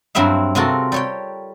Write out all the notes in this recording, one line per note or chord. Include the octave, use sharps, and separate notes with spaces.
G2 F#3 C4 E4 E5 F5
C3 C4 F4 F#4 A4 A#4
G3 C#5 G5